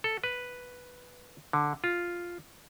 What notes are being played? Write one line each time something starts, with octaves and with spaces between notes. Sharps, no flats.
A4
B4
D3
F4